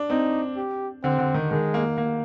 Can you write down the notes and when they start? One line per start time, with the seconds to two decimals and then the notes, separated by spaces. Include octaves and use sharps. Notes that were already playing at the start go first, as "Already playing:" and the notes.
Already playing: D4
0.10 C4 D#4
0.56 G4
1.04 D3 C4
1.19 D3
1.34 D#3
1.51 D#3 G#3
1.74 A#3
1.98 A#3